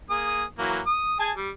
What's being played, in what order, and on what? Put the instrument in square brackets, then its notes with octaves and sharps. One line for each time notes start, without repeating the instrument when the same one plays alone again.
[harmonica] A#3 G#4 D#6
E3 F#3 A#3
D#6
G#4 G#5 A5
G3